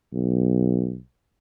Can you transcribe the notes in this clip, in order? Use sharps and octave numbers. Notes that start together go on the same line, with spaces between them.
B1